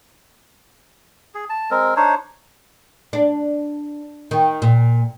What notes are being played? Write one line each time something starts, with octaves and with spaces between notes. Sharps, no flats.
G#4
A5
G#3 C4 A#4
D4 D#4 C5 C#5
D4
D#3
A#2